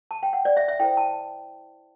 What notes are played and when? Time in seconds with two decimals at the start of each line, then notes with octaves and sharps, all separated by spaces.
0.11 A5
0.23 G5
0.33 F#5
0.45 D5
0.57 E5
0.68 E5
0.80 E4 A4 C5 G5
0.97 A5